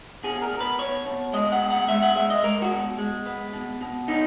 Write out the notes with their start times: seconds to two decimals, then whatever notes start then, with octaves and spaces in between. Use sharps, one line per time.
0.24 B2 G#4
0.42 A#4
0.51 B2
0.61 B4
0.78 B2 C#5
1.06 B2
1.33 G#3 D#5
1.52 F#5
1.61 B2
1.70 F#5
1.88 G#3 E5
2.02 F#5
2.16 G#3 E5
2.30 D#5
2.43 G#3 A#4
2.62 F#4
2.71 B2
2.98 G#3
3.26 B3
3.53 B2
3.81 B2
4.08 B3 D#4